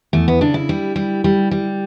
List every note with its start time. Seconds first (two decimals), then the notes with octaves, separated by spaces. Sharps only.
0.13 E2 A3
0.28 B3
0.41 C#3 D4
0.54 E4
0.69 G3
0.96 G3
1.24 G3
1.51 G3